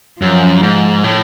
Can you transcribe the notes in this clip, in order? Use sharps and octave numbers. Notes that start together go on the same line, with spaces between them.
F#2 F3
G#2
A2